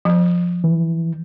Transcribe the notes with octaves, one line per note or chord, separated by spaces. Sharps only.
F3
E3